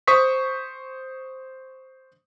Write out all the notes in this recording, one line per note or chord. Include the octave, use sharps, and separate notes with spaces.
C5 C#6 D#6 B6